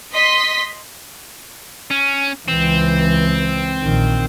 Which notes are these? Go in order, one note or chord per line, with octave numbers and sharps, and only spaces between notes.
D#5 C6 B6
C#4
C#2 E3 C4
A#1 D#3